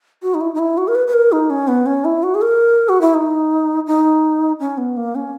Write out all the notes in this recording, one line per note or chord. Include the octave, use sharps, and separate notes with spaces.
F#4
D#4
E4
D#4
E4
F#4
A#4
B4
B4
A#4
D#4
C#4
B3
C#4
E4
F#4
G#4
A#4
F#4
E4
D#4
D#4
C#4
B3
A#3
C#4